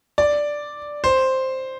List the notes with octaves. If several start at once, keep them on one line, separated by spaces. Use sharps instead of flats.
D5
C5